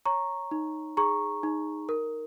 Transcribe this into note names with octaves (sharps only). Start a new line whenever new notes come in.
C#5 A#5 C#6
D#4
G#4 A#5 C#6
D#4
A#4